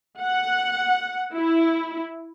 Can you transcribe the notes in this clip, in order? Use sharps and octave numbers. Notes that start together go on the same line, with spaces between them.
F#5
E4